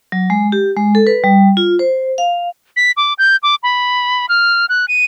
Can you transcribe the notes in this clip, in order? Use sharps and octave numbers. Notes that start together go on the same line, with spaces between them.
F#3
G#3
G4
G#3
A4
B4
G3
F4
C5
F5
B6
D6
G6
D6
B5
F6
F#6
D#7